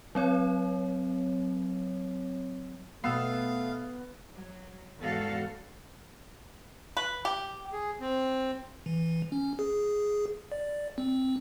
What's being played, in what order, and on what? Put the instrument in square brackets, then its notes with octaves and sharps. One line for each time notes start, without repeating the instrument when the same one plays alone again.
[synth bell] F#3 C4 C#5
[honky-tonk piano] B2 E6 C7 [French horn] A3 [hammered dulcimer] B3 [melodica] F5
[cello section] F#3
E2 G#2 F#4 A4 F5
[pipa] B4
G4
[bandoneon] G#4
C4
[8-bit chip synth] E3
C#4
G#4
D5
C4